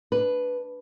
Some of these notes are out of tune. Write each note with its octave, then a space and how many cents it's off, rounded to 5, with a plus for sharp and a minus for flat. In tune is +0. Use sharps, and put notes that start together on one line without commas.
D4 +0 B4 +0